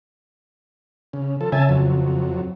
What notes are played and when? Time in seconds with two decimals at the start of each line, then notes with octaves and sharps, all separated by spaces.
1.13 C#3
1.41 F3 A4
1.52 C#3 E5 G#5 A5
1.69 F2 F#3